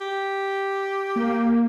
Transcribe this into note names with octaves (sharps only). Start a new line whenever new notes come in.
G4
A#3